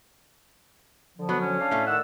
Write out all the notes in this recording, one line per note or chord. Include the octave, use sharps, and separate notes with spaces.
D3 F3
F#3 B3
C#4
D4 F5
A2 A3
D#3 D5 F#5 E6